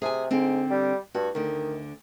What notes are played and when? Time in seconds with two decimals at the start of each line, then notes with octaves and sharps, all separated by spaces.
0.02 C3 G#4 G#5
0.31 G#2 D3 C4
0.70 G3
1.15 G2 F#4
1.35 D2 D3 D#3